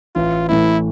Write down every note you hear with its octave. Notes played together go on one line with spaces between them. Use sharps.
A1 F4
A2 E3 A3 E4